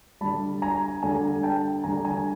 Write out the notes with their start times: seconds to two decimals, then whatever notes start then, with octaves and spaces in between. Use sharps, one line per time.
0.21 D3 G3 A5 B5
0.62 G#5 A#5
1.02 D3 G3 G#5 A#5
1.43 G5 A5
1.84 D3 G3 G#5 A#5
2.05 G#5 A#5